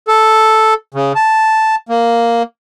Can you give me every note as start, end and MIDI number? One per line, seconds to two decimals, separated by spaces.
0.08 0.74 69
0.94 1.13 49
1.16 1.75 81
1.89 2.43 58